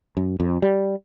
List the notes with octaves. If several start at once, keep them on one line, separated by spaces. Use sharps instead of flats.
F#2
F2
G3